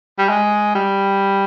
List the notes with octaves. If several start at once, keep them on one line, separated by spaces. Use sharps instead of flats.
G3
G#3
G3